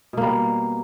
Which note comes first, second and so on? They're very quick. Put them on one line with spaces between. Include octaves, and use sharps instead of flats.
B2 A#3 G3